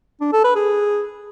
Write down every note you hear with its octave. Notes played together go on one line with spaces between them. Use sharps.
D4
A4
B4
G#4